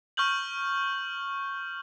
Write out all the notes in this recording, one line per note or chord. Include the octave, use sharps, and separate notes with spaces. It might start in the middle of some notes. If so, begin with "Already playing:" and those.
C#6 F6 G6 F#7